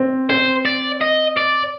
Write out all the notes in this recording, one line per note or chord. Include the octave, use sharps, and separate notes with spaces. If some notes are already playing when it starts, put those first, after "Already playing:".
Already playing: C4
C4 C5
D5
D#5
D5